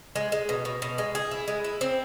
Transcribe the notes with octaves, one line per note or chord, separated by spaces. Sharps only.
G#3
G#3
B2
B2
B2
G#3
G#4
E4
G#3
E4
C4